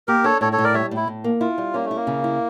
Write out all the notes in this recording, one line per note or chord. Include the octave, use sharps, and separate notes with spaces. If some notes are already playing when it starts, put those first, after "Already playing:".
A#3 G4 A#4
D4 A4 C#5
A2 A4 C#5
A4 C#5
A2
A#4 D5
G3 C#5 E5
A2
E4
A2
A#3
E4 F4
G3
A#3 C#4
A3
E4
A#3
C#3
E4